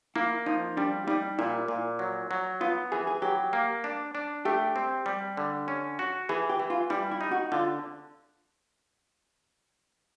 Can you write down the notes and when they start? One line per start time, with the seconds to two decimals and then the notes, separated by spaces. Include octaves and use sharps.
0.16 A#3 E4
0.46 F3 D#4
0.77 G3 D4
1.07 G3 D#4
1.39 A#2 E4
1.68 A#2
1.99 F#3
2.31 F#3
2.61 B3 F4
2.92 E3 G#4
3.07 G#4
3.22 F#3 G4
3.53 A#3
3.84 D4
4.15 D4
4.45 A3 G4
4.76 C4
5.06 G3
5.37 D3
5.68 C#4
5.99 F#4
6.29 E3 G#4
6.50 G4
6.60 E3
6.70 F4
6.90 G3 E4
7.11 E4
7.21 D#4
7.31 F#4
7.52 D3 F4